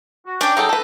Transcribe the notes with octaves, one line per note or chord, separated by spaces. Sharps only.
F#4
C#4 D4 D5 G5
F#3 D#4 G#4 A4
A4 B4